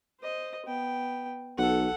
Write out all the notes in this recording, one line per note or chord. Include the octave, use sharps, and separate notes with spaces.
C5 D#5
B3 G5
B1 A4 F#5